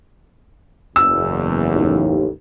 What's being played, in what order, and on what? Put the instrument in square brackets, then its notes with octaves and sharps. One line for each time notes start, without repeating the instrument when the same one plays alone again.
[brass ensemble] F#1 E2 [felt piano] E6
[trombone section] A1 D#2